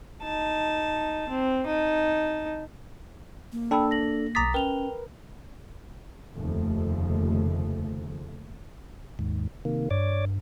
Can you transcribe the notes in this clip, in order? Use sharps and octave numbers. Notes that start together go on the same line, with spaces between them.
D#4 A5
C4
D#4 A5
A#3
D4 A4 G5 B5 E6
A#6 F#7
B1 A#5 D6 D#6 A6 B6
C#4 A#4 B4 G5 F7 G7
F1 D#2 C#3 F3 A3
D#2 G#2
C3 D#3 A#3
G2 C#5 D5 D6